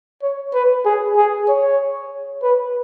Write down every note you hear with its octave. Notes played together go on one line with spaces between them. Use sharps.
C#5
B4
G#4
G#4
C#5
B4